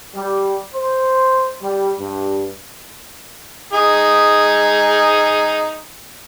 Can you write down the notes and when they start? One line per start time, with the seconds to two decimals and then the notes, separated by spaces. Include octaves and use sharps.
0.16 G3
0.74 C5
1.62 G3
1.99 G2
3.73 D#4 G#4